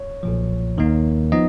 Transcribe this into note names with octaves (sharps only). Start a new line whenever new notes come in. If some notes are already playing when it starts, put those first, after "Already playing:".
Already playing: C#5
B1 A#2 F3
D#2 D#3 A#3 D#4
F3 B3 D#4 D#5